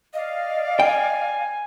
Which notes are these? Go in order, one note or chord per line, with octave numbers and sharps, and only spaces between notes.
D5 D#5 F5
G5 G#5